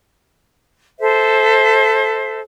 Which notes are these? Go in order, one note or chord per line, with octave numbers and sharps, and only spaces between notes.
A4 C5 E5